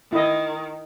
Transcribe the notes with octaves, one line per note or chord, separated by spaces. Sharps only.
D#3 E4 D#5